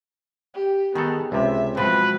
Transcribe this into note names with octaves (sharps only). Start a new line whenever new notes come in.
G4
D#3 B3 G#4 A4
C#2 C3 E5
B2 F3 F#3 G#3 C4 B4